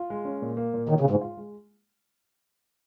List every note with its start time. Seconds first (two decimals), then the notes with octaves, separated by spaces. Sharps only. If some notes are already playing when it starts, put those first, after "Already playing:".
Already playing: F4
0.10 G#3
0.25 C#4
0.42 A#2
0.57 A#3
0.74 A#2
0.89 D#3 C#5
1.00 C#3
1.06 G#2 G#3
1.21 F4
1.37 G#3